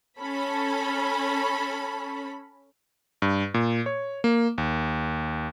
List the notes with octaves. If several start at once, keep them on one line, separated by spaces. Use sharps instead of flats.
C#4 A4 B5
G2
A#2
C#5
A#3
D#2